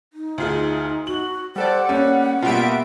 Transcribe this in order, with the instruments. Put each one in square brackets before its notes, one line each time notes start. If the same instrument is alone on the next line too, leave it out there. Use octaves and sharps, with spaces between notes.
[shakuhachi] D#4
[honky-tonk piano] D2 F4 G#4
[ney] F#4 [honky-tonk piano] F#7
[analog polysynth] G3 A4 D5 [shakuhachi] C5 [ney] F#5
[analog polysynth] G3 [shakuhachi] A#3 [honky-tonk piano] C#4
[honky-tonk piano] B2 G3 [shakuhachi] A#3 [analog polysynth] F4 E5 D7